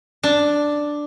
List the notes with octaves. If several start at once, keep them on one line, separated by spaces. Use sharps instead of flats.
D4